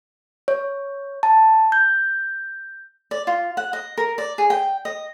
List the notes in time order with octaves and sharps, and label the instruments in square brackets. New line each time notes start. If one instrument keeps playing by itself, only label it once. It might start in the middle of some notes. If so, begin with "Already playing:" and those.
[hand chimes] C#5
A5
G6
[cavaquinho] D5
F4
F#5
D#5
A#4
D5
G#4
G5
D#5